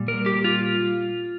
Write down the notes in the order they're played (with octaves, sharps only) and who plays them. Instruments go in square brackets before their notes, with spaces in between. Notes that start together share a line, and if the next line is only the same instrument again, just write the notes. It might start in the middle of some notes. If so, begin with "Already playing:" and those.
Already playing: [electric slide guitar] A#2 G3
A#4
G4
F4